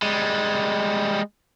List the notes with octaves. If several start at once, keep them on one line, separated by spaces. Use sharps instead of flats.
G3 G#3